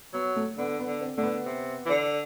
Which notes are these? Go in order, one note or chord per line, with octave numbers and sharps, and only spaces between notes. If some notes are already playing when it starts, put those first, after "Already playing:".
F#3 B3
A3
D3 B3
B3
D3
C4
D3 A3
B3
C3
E3
D3